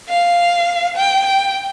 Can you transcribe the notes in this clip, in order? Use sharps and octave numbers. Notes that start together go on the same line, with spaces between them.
F5
G5
G5